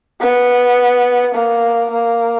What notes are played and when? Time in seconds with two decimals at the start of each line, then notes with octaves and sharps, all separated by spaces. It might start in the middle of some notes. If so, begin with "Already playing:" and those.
0.21 B3
1.35 A#3
1.92 A#3